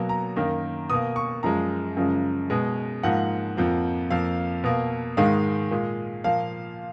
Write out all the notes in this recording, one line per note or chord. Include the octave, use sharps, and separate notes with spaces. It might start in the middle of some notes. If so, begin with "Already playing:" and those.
Already playing: B2 F#3 A#3
A#5
F#2 D#3 A#3
B2 A#3 D#6
C#6
F#2 F3 G#3 A#5
F#2 C#3 F3 G#3
B2 G#3
G#2 F3 A#3 F#5
F2 F3 A#3
F2 F3 A#3 F5
B2 A#3
G#2 D#3 G#3 F5
A#2 G#3
A#2 F3 A#3 F5